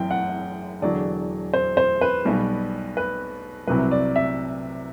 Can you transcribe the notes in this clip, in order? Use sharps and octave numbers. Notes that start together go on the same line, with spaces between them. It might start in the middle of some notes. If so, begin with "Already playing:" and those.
Already playing: F#1 F#2 E3 G5
F#5
E1 E2 D3 F#3 D5
C5
C5
B4
B1 B2 G3
B4
C2 C3 F#3 B4
D5
E5